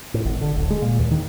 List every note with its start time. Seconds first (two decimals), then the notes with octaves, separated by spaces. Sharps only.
0.14 A2
0.25 G#1
0.41 D3
0.55 D1
0.70 G#3
0.82 A#2
0.99 D#2
1.11 D#3